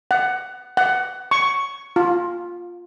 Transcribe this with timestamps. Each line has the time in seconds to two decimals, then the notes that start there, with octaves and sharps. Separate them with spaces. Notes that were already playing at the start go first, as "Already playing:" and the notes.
0.11 F#5
0.77 F#5
1.31 C#6
1.96 F4